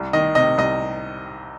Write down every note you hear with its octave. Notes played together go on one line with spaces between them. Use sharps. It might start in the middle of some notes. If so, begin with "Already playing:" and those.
Already playing: C2
D#3 D#5
C3 D#5
C2 D#5